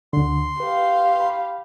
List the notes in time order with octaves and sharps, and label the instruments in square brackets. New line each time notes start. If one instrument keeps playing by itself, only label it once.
[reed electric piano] D2 D3 [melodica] C6
[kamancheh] G4 F5 [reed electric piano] B4
[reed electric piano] B5